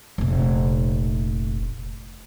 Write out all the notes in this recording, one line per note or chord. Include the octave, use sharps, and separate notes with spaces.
F1 A#1